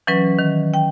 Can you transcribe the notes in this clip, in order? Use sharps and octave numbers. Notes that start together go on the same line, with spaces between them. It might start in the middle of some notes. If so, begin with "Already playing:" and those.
E3 F#3 C#4 B4
D#3
G5